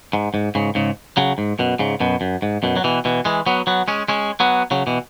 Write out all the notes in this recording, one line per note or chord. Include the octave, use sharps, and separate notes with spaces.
G#2
G#2
G#2 C#3
G#2 C#3
C#3 F#3
G#2
F#2 B2
G#2 C#3
F#2 B2
F#2
G#2
F#2 B2
F#3
B2 E3
B2 E3
E3 G#3
F#3 B3
F#3 B3
G#3 C#4
G#3 C#4
F#3 B3
C#3 F#3
B2 E3